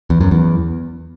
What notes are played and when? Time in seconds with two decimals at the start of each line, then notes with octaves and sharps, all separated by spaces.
0.10 E2
0.21 F#2
0.31 E2